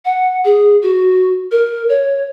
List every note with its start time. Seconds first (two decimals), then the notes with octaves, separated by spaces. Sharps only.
0.05 F#5
0.45 G#4
0.83 F#4
1.51 A#4
1.89 C#5